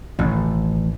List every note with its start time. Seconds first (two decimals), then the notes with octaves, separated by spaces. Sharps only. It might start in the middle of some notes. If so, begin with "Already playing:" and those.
0.19 A1 B2 D#3